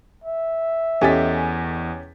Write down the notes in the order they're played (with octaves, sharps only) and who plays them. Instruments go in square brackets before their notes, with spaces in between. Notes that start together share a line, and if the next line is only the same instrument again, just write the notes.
[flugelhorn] E5
[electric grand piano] E2 D#5 A6 [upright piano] C#4 G4 [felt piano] A4 G#5 B6